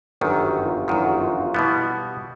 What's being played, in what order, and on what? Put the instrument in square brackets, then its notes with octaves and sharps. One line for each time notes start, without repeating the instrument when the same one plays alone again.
[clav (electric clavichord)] G1 F#2 D#3 [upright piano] G4
[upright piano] F#4
F4
[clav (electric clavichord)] G1 F#2 D#3 [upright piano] E4
[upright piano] F#4
F4
F4
[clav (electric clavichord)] B2 G3 B3 [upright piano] E4